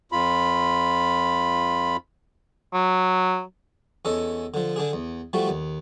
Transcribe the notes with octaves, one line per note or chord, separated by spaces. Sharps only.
F2 F4 B5
F#3
E2 C#4 A4 D#5
D3 F3
D3 D4 G#4
E2
F3 G3 A3 F#4
D#2